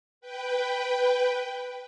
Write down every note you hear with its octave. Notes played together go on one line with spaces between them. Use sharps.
B4 G5